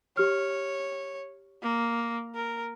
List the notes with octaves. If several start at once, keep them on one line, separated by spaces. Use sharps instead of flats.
G4 C#5 F6
A#3
A#4